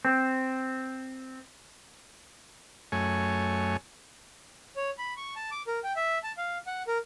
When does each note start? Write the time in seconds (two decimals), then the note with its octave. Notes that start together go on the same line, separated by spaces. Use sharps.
0.05 C4
2.92 F#2 A3 C#5 G#5
4.76 C#5
4.98 B5
5.17 C#6
5.36 A5
5.51 D6
5.67 A#4
5.84 G5
5.96 E5
6.23 A5
6.37 F5
6.67 F#5
6.88 A#4